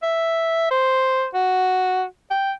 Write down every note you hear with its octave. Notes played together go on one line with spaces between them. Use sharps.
E5
C5
F#4
G5